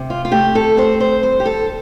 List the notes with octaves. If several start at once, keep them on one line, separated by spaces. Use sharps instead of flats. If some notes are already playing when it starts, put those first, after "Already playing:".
Already playing: C3
F4
F4
A3 G4
A4
C4 C5
C5
G2 C5
G4
A4